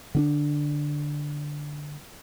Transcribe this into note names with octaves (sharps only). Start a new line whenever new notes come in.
D3 C#4 D4